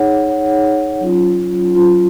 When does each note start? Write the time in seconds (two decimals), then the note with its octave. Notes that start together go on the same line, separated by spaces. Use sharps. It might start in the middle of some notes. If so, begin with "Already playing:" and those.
Already playing: D#4 G#4 C#5 F#5
0.26 D#4 G#4 C#5 F#5
1.00 F#3 C#4 F4
1.75 F#3 C#4 F4